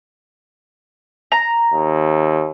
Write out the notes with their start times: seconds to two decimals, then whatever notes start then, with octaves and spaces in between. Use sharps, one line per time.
1.32 A#5
1.73 D#2